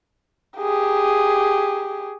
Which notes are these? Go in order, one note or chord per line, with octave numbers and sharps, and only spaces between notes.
G4 G#4